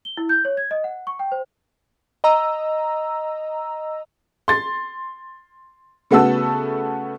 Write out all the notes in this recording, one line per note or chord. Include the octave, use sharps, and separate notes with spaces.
G7
E4
G6
C#5
G#6
D#5
F#5
C#6
G5
C5
D#5 A#5 E6
C6 A6
C#3 A3 B3 F#4 A4 E6